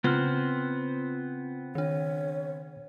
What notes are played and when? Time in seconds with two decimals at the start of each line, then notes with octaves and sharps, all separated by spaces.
0.04 C#3 B3 C4 F4 C5 F6
1.75 D#3 D4 C#5